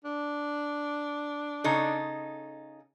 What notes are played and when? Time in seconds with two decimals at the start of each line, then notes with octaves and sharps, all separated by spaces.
0.05 D4
1.64 C#3 D#4 A4